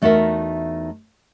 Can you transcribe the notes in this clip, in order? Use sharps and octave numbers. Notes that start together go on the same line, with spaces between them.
E2 A3 D#4 F#4 A#4 E5